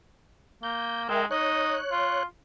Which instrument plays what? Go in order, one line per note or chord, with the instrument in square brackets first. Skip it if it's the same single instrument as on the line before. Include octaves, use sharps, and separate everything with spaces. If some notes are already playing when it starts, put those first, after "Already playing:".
[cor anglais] A#3 [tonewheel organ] G6
[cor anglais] G#3 [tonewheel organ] A#4 E5 G5
[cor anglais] D#4 [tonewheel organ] C#5 F#6
[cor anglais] F4